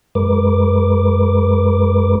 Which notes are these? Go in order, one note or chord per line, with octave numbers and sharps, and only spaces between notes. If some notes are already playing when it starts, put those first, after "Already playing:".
F#2 G#3 A#4 B4 D6